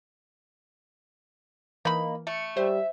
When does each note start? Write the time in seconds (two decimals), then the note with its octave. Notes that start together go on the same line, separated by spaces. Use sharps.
1.85 E3 A#3 D#4 B5
2.27 A3 C#7
2.57 G3 C5 E5